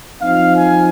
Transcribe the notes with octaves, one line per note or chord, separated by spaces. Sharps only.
F3 C4 D#4 F5
G#5